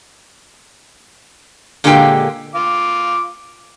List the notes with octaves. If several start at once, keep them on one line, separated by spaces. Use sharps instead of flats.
A#2 D3 G#3 A#3 G4 G5
F4 F5 D6